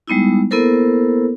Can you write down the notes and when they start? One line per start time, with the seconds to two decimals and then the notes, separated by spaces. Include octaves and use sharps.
0.07 G3 G#3 B3 D#4 E4
0.51 A#3 B3 E4 A4 A#4 C5